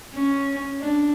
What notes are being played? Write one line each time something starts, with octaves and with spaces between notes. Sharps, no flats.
C#4
D4